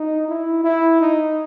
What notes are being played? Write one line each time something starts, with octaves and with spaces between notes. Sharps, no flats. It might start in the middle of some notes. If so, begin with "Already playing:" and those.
Already playing: D#4
E4
E4
D#4